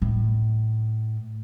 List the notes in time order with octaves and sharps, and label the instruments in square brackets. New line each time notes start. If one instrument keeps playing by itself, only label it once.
[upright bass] A2